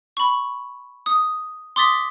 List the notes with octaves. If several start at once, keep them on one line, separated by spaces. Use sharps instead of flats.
B5 C#6
D#6
C6 D6 D#6 A6 B6